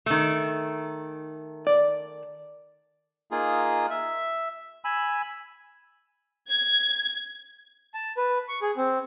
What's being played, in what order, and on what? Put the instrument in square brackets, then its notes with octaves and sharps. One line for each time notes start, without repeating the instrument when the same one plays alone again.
[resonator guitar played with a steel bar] D#3 A3
[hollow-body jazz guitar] D5
[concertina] A#3 D#4 F4 G#4
E5
G#5 B5 E6
[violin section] G#6
[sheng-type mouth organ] A5
B4
C#6
G#4
C4